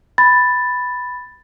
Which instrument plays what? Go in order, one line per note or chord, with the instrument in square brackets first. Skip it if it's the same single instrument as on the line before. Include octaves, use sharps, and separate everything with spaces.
[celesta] B5 A6